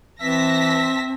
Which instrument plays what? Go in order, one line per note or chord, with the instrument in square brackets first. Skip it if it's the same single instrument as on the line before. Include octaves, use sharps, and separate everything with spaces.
[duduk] E3 [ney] C4 [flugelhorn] E5 [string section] A5 A#6 B6